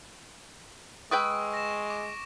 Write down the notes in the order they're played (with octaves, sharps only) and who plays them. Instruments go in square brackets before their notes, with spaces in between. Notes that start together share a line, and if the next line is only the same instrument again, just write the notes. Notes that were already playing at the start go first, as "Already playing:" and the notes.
[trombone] G#3 [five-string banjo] G#4 B4 G5 [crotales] C#6 D7 [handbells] D#6 E6
[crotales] A#6 E7
D6